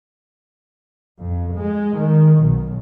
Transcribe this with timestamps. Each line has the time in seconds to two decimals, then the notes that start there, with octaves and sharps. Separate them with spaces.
1.19 F2
1.54 G#3
1.96 D#3
2.39 B1